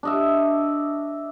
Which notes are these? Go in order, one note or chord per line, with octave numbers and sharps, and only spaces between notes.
D4 D#5 E5